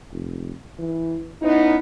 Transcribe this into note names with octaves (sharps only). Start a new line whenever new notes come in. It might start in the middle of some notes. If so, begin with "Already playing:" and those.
F1
E3
B3 C#4 D#4 E4